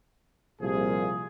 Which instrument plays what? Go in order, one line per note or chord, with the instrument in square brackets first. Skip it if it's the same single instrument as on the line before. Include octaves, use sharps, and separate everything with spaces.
[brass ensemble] C2 A#2 F3 G#4